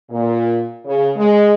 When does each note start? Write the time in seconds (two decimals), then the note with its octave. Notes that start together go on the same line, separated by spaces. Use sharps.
0.10 A#2
0.85 C#3
1.16 G#3